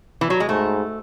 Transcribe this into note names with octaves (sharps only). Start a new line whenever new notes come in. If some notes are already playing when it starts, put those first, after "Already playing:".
E3
F#3
G#3
G#2 A3